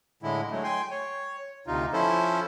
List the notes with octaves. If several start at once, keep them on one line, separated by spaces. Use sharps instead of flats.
A2 D3 G#3 E4
F#3 G#3 A3
G5 G#5 C6
C#5
D2 C3 D#4 F4
F3 C#4 E4 A4 C5